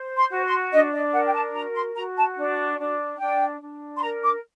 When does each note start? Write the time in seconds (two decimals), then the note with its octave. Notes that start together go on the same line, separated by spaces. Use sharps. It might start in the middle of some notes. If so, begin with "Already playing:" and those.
Already playing: C5
0.16 C6
0.30 F#4
0.44 C6
0.72 D4 D#5
0.93 D#5
1.13 A#4 F#5
1.27 G5
1.33 A5
1.54 F#4 A#5
1.75 C6
1.95 F#4 A#5
2.16 A5
2.36 D4
2.78 D4
3.19 D4 G5
3.61 D4
3.97 C6
4.02 A#4 A#5
4.23 D6